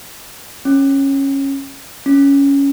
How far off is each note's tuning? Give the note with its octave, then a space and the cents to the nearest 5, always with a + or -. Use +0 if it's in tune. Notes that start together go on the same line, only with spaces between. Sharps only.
C#4 -15
C#4 +10